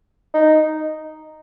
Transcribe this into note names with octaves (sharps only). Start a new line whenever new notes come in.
D#4